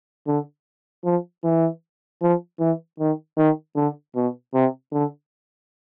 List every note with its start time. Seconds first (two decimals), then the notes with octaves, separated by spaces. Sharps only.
0.27 D3
1.04 F3
1.44 E3
2.21 F3
2.59 E3
2.99 D#3
3.37 D#3
3.76 D3
4.15 B2
4.54 C3
4.93 D3